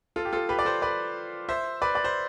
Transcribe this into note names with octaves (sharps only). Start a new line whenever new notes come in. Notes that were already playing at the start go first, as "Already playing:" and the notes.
F4 A4
G4
F4 A4
G4 B4
D5
A4 C5
B4 D5
C5 E5
B4 D5
D5
C5